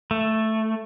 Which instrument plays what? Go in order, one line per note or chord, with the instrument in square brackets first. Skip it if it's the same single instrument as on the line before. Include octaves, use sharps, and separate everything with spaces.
[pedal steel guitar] A3